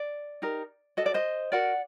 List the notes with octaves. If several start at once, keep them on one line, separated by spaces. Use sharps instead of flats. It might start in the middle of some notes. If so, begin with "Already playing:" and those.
Already playing: D5
D#4 G4 A#4
F#4 A4 D#5
D5
C5 D#5
F#4 A#4 D5 F#5